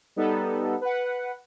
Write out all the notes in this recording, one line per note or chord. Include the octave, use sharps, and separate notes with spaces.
G3 B3 D#4 A4
B4 F#5